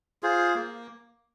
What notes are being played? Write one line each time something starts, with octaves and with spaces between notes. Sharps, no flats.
F4 G#4 C5
A#3